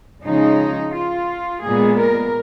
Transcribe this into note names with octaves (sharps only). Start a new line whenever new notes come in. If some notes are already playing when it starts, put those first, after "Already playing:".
C#3 F3 G#3 D#4
F4
A#2 G#3 B3 G#4
A#4